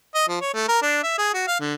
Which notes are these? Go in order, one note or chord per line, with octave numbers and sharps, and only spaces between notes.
D#5
F3
C#5
A3
A#4
D4
E5
G#4
F#4
F5
D3